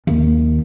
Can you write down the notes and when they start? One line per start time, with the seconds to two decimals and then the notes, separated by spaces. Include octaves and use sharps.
0.07 D#2